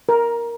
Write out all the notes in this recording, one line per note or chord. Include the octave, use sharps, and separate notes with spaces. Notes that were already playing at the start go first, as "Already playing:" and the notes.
A#4